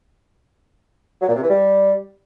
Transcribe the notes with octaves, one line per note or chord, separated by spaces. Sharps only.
F#3
A#2
C3
E3
G3